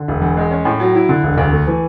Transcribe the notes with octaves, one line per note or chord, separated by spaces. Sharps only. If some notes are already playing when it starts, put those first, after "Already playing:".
Already playing: D3
E1
E2
G#3
C#4
A2
F#3
E4
D3
E1
D2
A3
E3